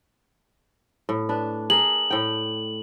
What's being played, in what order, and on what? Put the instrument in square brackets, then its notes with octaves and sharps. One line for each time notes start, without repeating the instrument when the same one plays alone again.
[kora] A2
D4 B4
[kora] G#4 A#4 [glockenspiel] F#7
[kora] A2 G5